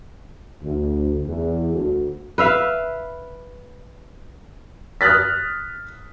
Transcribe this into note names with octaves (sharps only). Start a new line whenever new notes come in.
D2
E2
D2
B4 E5 F5
D#6 F6 F#6 A6 B6